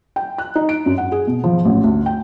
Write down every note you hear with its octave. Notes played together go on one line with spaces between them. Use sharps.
G5
F#6
D#4
D7
F#2
F#5
G#4
B2
F3
A1
D2
G5